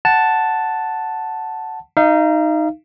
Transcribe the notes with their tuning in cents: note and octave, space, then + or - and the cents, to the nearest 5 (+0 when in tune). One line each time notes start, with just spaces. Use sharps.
F#5 +0 A5 +0
D#4 +0 F5 -35